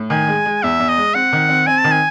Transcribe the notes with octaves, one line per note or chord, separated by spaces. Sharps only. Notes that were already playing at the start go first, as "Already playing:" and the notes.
Already playing: A2
D#3 G#5
G#3
G#3
E2 E5
E2
D#5
G#3
C4 F#5
D#3
C4
C4 G#5
A5
D#3
G#5